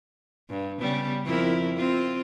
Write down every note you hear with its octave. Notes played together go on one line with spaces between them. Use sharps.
G2
C#3 G3 B3
F2 E4 A#4
C4 F4